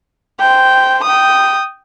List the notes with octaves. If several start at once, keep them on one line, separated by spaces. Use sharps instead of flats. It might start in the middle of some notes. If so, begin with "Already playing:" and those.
C5 G5
G5 D#6